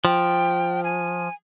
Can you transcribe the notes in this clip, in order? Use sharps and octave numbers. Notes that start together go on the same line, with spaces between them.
F3 G5
G#5